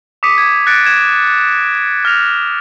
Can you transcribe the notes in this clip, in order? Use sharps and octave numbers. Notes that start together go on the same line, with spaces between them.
D6 D#6 B6 C#7 D#7
G#6 B6
F#6 A6 A#6 C#7 D7
G#6 E7
F6 A#6 F7